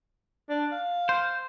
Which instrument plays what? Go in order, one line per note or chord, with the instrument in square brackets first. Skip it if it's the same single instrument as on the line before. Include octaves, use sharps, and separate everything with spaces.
[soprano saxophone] D4
F5
[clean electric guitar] C5